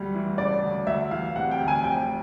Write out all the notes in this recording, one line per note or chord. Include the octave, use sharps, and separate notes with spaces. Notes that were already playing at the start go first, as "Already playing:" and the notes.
Already playing: D2 G3
E3
C#3 D5
D2
D2 E5
E3 F5
C3 F#5
G5
D2
G#5
F1 G5